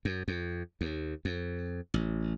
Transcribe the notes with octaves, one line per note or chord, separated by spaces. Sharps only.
F#2
F2
D#2
F2
A1